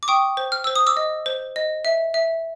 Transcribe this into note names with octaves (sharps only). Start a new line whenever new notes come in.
D6
G5 C#6 D#6
C5
F6
C5 E6
D#6
D6 E6
D#5
C5
D#5
E5
E5